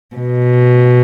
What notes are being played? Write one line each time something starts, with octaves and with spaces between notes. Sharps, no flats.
B2